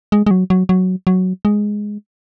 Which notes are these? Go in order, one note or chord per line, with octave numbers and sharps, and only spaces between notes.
G#3
G#3
F#3
F#3
F#3
F#3
G#3